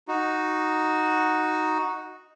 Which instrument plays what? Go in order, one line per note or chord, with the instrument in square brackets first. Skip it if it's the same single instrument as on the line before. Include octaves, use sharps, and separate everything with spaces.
[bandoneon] D#4 F#4